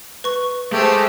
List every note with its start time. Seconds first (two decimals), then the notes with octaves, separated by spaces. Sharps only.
0.24 B4 C#6
0.72 G#3 A3 G4 C5